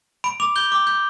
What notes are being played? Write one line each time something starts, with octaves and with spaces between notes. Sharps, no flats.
B5 D7
D6 F7
G6 G7
D6
G6